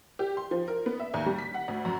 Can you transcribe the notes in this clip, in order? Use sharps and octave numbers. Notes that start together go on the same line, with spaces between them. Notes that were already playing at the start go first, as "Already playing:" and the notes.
G4
C6
F3
A#4
B3
E5
D#2
G3
B6
F#5
D2
F#2